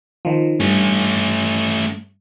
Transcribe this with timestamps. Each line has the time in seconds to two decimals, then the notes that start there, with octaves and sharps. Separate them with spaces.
0.25 D#3 F3
0.60 G2 A3 C#4